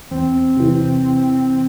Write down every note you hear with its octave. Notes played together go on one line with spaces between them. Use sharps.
E2 C4
C3 E3